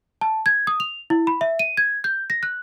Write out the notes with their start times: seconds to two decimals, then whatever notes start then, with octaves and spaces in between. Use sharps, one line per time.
0.21 A5
0.46 G#6
0.67 D#6
0.80 F7
1.10 E4
1.27 B5
1.41 E5
1.59 D#7
1.77 G#6
2.04 G6
2.30 A#6
2.43 F#6